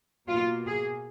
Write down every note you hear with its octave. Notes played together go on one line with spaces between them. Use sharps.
B2 A#3 F4
G#4